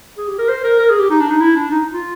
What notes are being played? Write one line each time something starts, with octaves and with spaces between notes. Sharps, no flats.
G#4
G4
A#4
C5
A#4
A#4
G#4
G4
D#4
D4
D#4
E4
D4
D#4
F4